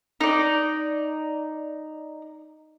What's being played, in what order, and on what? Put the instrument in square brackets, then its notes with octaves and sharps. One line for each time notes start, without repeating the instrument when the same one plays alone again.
[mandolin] D#4 D5